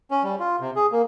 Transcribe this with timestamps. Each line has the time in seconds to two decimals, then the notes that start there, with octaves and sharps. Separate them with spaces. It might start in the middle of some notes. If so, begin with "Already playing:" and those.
0.11 C#4
0.23 G3
0.40 F4
0.60 C3
0.76 G#4
0.92 A#3